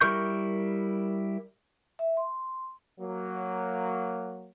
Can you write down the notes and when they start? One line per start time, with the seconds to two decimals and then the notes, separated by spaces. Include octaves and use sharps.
0.01 G3 E4 A#4 C#6 G6
1.99 E5
2.17 C6
3.00 F#3 A#3